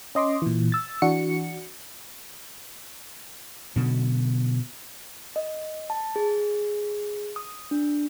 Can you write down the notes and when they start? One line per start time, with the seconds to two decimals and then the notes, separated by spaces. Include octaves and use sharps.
0.15 C#4 D#5 C6 D6
0.42 A#2 E3
0.72 E6 A6
1.02 E3 D4 F#4 C#7
3.76 B2 D3 F#3
5.36 D#5
5.90 A5
6.16 G#4
7.36 D#6
7.71 D4